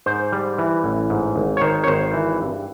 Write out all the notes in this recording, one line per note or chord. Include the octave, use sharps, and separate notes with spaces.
G#2 C5
G3
E3
A1
G#2
G#1
C#5
D#3 C5
C#5
G#1 C5
E3
G2